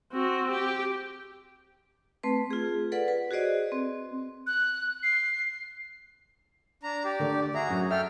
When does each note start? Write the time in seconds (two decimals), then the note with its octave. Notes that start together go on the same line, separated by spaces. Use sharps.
0.13 C4 F#4
0.51 G4
2.23 A3 C4 B4
2.51 F4 G#4
2.92 A4 B4 D5 F#5
3.08 B4
3.31 F#4 G#4 C5 D5 D#5
3.72 C4
4.47 F#6
5.03 C7
6.83 D4 A#5
7.05 G4 D5
7.19 D3 A3
7.54 F#4 G#4 E5 A#5
7.69 F#2 F#3
7.91 A4 E5 G5 F6